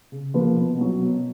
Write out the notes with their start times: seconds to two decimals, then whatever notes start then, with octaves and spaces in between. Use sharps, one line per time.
0.12 C#3
0.34 F3 A#3 F4 B4
0.56 B2
0.77 F#3 B3
0.99 B2